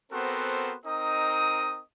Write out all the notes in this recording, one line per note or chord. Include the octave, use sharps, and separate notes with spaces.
B3 C4 F#4 A4 A#4 C5
C4 D#4 A#4 D#5 D#6